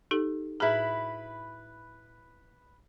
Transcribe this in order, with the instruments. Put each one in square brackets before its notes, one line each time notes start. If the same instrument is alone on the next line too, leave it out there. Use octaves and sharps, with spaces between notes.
[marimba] D#4 G4 A4
[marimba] A2 G#4 [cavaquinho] E4 B4